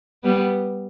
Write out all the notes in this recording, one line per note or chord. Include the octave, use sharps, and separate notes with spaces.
G3 B3